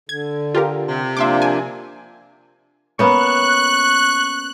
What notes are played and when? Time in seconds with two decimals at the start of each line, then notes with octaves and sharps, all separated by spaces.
0.09 D3 G#6
0.55 F4 G4 A#4
0.88 C3
1.17 F3 A#3 D4 E5 C6 D6
1.42 G#5
2.99 A#3 B3 C#4 C#6 F#6